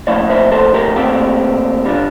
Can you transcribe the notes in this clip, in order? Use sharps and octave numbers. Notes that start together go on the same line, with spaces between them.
A#2 F3 A3 E4 D5 F5
C5 E5
A4 C5
G4 A#4
A#2 A3 C4 F4 G4
D3 G3 D4 F4